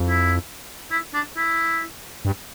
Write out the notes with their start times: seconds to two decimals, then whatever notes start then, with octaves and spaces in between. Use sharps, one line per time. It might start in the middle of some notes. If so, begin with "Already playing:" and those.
Already playing: F2
0.08 E4
0.91 E4
1.14 D4
1.37 E4
2.25 G2